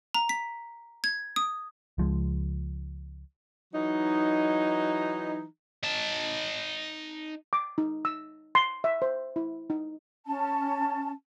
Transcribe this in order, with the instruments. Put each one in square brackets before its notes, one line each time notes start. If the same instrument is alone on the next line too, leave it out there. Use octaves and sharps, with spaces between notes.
[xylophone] A#5
B6
G#6
D#6
[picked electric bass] C#2 F3 G#3
[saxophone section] E3 F#3 D#4
[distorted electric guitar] D#4 A5
[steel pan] D6
D#4
E6
C6
E5
C5
E4
D#4
[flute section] C#4 A5